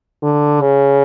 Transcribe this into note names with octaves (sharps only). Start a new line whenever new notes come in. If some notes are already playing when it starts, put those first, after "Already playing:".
D3
C#3